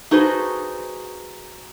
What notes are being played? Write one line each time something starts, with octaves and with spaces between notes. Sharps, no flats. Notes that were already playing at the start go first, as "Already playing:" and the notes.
D#4 F#4 G#4 A4 B4 C5